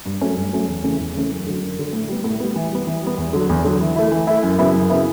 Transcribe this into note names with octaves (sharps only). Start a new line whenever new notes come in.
G2
F#3 A3 C#4
G2
F#3 A3 C#4
E2
C#3 E3 A3 C#4
E2
C#3 E3 A3 C#4
F#2
D3 F#3
F#2
D3 F#3
A2
G3 B3
A2
G3 B3
E3
G3 B3
E3
G3 B3
E2
D3 F#3
E2
D3 F#3
E3
A3 E4
E3
A3 E4
F#2
C#3 F#3 B3 E4
F#2
C#3 F#3 B3 E4